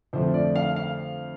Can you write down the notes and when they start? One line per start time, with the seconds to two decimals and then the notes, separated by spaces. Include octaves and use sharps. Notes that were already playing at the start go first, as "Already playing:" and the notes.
0.13 F2 D3 F3 A3 C5
0.34 D5
0.56 F5
0.76 F5